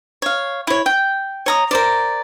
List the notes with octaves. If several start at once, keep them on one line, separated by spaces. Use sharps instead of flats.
C#5 F5
E4 C#5
G5
C#5 A#5 D#6
A#4 C5 D5